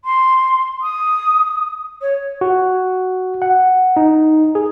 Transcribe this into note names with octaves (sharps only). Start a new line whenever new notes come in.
C6
D#6
C#5
F#4
F#5
D#4
G#4